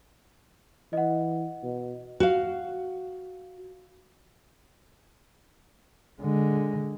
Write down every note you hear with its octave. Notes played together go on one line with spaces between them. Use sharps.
E3 D#5 F#5
B2
F#4 F5
D3 G#3